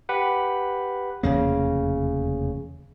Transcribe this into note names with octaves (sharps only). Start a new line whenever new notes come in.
G4 B4 F#5
F1 E2 C#3 A#3